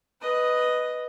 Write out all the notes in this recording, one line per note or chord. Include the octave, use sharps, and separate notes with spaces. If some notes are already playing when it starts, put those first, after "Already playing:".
B4 D#5